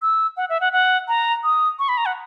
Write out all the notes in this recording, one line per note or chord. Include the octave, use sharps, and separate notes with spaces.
E6
F#5
E5
F#5
F#5
A#5
D#6
C#6
B5
A#5
F#5